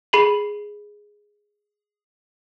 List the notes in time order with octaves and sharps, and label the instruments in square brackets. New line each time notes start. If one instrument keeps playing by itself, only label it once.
[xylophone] G#4 B5 C7 D#7 F#7